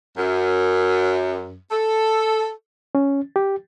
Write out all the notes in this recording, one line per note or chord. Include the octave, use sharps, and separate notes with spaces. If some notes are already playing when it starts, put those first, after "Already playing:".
F#2
A4
C#4
G4